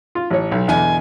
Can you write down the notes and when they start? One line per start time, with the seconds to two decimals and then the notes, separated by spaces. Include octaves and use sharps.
0.15 F4
0.30 A1 C#5
0.51 B1
0.68 E2 B2 D3 G#5